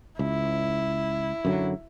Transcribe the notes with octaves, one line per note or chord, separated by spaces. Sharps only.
C#2 E4
F#2 D3 F#3